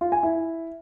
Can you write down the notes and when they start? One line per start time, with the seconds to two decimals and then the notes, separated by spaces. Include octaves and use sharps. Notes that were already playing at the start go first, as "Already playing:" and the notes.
0.01 F4
0.12 G#5
0.23 E4